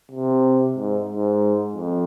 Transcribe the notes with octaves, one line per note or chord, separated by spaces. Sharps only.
C3
G#2
G#2
F2